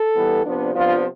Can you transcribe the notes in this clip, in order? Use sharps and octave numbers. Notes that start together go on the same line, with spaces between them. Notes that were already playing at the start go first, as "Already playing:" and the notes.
Already playing: A4
E3 G3 B3
C3 F3 B3 D4
C3 F3 B3 D4 F4